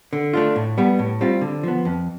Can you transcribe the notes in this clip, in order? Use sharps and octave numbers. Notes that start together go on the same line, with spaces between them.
D3
A3 D4 F4
A2
G3 B3
A2
G3 C4 F4
D3
F3 B3
F2